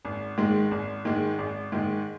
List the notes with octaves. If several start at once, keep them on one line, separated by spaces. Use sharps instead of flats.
G#1
G#2 D#3 G#3
G#1
G#2 D#3 G#3
G#1
G#2 D#3 G#3